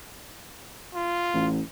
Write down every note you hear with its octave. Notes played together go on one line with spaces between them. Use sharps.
F4
A1